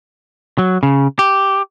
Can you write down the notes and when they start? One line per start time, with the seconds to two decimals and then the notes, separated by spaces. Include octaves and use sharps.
0.58 F#3
0.83 C#3
1.19 G4